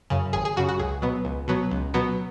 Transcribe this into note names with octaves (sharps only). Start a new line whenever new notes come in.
F#2 C#3
G#1 G#4
G#4
F#2 C#3 F#4
F#4
C#2 G#4
B2 F#3 B3
C#2
B2 F#3 B3
C#2
B2 F#3 B3